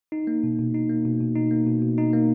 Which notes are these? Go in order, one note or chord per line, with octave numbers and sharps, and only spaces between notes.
D#4
A#3
B2
B2
D#4
A#3
B2
B2
D#4
A#3
B2
B2
D#4
A#3